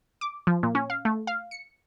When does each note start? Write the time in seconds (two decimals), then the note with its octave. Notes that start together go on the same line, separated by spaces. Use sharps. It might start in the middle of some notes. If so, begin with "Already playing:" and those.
0.21 D6
0.47 F3
0.63 A#2
0.75 C#4
0.90 F5
1.05 A3
1.27 F5
1.51 C#7